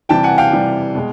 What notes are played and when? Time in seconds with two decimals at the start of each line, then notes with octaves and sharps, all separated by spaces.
0.09 C3 E3 G3 G5 A5
0.23 F#5 G#5
0.38 F5 G5
0.52 C3 E3 G3
0.95 B2 G#3